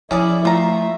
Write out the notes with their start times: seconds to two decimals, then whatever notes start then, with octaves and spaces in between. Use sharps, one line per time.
0.11 F3 C#4 E4 G#4 D5
0.45 A3 F4 E5 F5 A#5